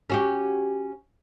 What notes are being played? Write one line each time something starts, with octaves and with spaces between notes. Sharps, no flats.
C#4 F#4 G4